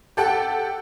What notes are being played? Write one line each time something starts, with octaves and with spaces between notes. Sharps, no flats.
G4 A4 F#5 G5